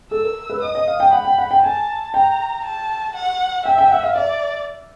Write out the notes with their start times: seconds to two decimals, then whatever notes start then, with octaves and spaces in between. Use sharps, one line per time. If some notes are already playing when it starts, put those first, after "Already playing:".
0.11 A4 E6
0.24 A#4
0.50 B4
0.62 D#5 D#6
0.75 D#5
0.87 F5
1.00 G5
1.13 F#5 B5
1.25 G5
1.39 F#5
1.51 G5
1.63 G#5 A5
2.14 G5 A#5
2.65 A5
3.16 F#5
3.65 E5 G5
3.78 G5
3.91 F#5
4.03 F5
4.16 D5 E5